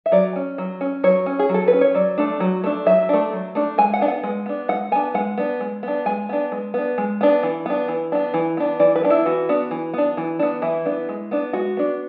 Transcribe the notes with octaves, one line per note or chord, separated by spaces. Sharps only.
E5
F#3 D5
C#4
F#3
C#4
F#3 C#5
C#4
G#4
F#3 A4
B4
C#4
C#5
F#3 D5
A3 D4
F#3
A3 D4
F#3 E5
A3 D4
F#3
A3 D4
G#3 G#5
F#5
B3 D4
F#5
G#3
B3 D4
G#3 F#5
B3 D4 G#5
G#3 F#5
B3 D4
G#3
B3 D4
G#3 G#5
B3 D4
G#3
B3 D4
G#3
B3 D4
E3
B3 D4
E3
B3 D4
E3
B3 D4
E3 D5
B4
B3 D4
E4
E3 F#4
B3 D4
E3
B3 D4
E3
B3 D4
E3 E4
B3 D4
G#3
B3 D4
G#3 F#4
B3 D4